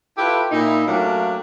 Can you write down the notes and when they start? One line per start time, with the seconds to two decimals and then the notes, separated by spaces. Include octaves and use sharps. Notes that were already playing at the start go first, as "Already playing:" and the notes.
0.17 E4 F4 G4 A4 B4
0.51 A#2 D#4 E4
0.87 F#3 A3 A#3 C#4 D4 G4